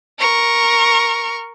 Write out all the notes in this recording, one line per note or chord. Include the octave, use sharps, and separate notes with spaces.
A#4 C#6